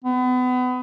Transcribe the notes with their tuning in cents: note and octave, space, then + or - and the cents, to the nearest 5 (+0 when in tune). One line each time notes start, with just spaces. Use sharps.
B3 +30